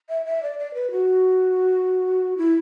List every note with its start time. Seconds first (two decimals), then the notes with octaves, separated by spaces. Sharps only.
0.09 E5
0.25 E5
0.43 D5
0.59 D5
0.74 B4
0.91 F#4
2.38 E4